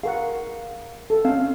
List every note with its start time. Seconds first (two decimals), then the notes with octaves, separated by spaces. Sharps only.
0.04 G#4 A#4 F5 F#5
1.10 A4
1.25 C4 C#4 F5